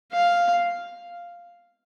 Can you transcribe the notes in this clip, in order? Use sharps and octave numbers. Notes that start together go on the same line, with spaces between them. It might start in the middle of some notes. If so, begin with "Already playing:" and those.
F5